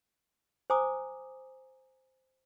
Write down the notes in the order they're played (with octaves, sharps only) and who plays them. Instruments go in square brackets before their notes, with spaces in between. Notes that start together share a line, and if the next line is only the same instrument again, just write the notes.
[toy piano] C5 G#5 A#5 D6 D#6